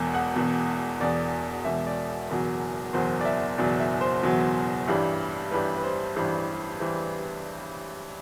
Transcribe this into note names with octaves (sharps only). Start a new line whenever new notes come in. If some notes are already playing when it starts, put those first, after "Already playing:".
Already playing: E1 E2 B2
F#5
E1 E2 B2
E1 E2 B2 D5
E1 E2 B2 E5
D5
F#1 E2 B2 F#3
F#1 E2 B2 F#3 C5
D5
E5
F#1 E2 B2 F#3 D5
E5
C5
F#1 E2 B2 F#3
A1 G2 E3 G3
A1 G2 E3 G3 B4
B4
C5
A1 G2 E3 G3 C5
E3 G3 C5